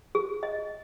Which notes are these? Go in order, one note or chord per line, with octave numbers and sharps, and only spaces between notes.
G#4
D#5